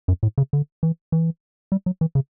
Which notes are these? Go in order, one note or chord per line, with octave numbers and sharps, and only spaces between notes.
F#2
A2
C#3
D3
E3
E3
G3
F#3
E3
C#3